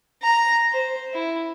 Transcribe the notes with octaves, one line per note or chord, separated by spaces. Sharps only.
A#5
C5
E4